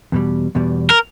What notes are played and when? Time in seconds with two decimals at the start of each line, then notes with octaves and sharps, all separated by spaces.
0.12 E2 B2 G3
0.55 E2 B2 G3
0.90 A#4